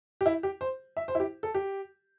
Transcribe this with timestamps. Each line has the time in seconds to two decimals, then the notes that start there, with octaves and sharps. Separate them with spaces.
0.21 G4
0.26 E4
0.43 G4
0.61 C5
0.97 E5
1.08 C5
1.15 E4
1.20 G4
1.43 A4
1.55 G4